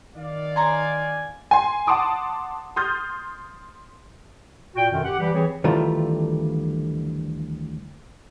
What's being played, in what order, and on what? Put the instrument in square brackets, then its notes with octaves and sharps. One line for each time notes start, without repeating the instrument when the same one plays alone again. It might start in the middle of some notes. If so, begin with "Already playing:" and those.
[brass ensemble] D#3 D5 F5
[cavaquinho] C#5 A#5 C6 [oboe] G#5
[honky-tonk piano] G#5 C6
F#5 A5 C6 D6 D#6
C6 D#6 F6 G6 A6
[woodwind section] A#2 F#4 G5
F#2 B2 D3 D#3
G4 F#5
E3 G3 G4
E3 C4 G#4 C#5
[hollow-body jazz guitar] D2 D#3 E3 G3 A3 F4